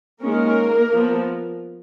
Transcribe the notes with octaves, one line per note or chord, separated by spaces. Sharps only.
D#3 G#3 A#3 C#4 A#4
F3 B3